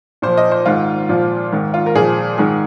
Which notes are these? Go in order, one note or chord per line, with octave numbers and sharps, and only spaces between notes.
A#2 F3 C5
D#5
C5
G#2 D#3 F4
A#2 F3
G#2 D#3
F4
A#4
A#2 F3 G#4
G#2 D#3 G#4